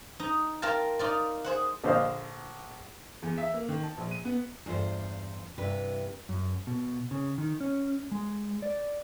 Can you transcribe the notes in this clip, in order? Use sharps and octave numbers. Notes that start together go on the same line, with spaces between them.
D#4
F4 A#4 F5 G5 A5
D#4 F4 D5
G#4 C5 F#5
A#1 D3 C5 D#5 F5
E2
E5
A#3
D#3
A5
A#1
D#7
B3
E2 G2 F4 C5
G2 C3 E3 B4
F#2
B2
C#3
D#3
C#4
G#3
D5